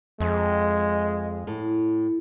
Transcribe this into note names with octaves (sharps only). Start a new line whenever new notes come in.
F2 G#3
A2